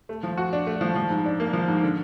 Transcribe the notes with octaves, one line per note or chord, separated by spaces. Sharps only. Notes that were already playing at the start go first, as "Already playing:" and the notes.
A3
F3
F#4
D4
A3
F3
F3
G#2
D4
A#3
F3
G#2
D3